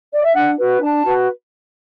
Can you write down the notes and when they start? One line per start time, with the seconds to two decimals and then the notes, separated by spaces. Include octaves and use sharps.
0.12 D5
0.24 E5
0.34 D4 F#5
0.58 F#4 B4
0.81 D4 A5
1.04 F#4 B4